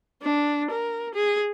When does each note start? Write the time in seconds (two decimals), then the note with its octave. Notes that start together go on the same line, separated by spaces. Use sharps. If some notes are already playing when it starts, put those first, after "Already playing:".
0.22 D4
0.71 A#4
1.15 G#4